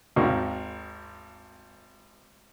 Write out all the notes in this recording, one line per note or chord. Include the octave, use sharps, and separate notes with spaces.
G#1 D#2 G#2 A#3 F#4 A#4